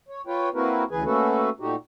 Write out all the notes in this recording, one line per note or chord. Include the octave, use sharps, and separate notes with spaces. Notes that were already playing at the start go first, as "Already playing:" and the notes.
C#5
F4 B4 C#5 G5
A#3 C4 E4 F#4 A#4 B4
D2 C#3 E3 G#4 B4 G#5
A3 A#3 C#4 F#4 A4 B4
A#2 A3 D#4 F#4 G4